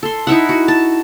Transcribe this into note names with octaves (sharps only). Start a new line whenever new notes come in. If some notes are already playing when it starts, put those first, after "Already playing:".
A4 C6
D#4 E4 E5 F#5
F#4
A5